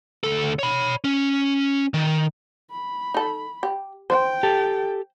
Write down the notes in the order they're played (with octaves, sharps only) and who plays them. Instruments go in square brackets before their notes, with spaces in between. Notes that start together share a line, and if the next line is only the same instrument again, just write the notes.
[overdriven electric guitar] D2 A4
C#5 B5
C#4
D#3
[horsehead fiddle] B5
[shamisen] D#4 A4
G4
[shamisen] C5 [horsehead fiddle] G5
[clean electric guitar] G4 A4 A5